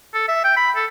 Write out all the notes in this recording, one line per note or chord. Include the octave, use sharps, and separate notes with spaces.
A4
E5
G5
B5
A4